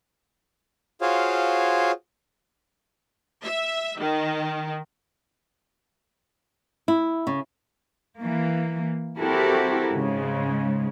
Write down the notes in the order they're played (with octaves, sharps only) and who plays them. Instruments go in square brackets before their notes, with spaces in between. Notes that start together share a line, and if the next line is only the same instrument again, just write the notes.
[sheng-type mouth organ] F4 F#4 G#4 C5 C#5 F5
[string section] E5
D#3
[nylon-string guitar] E4
C#3
[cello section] E3 A#3
C4 E4 F#4 G4 A4 A#4
G#2 C#3 G#3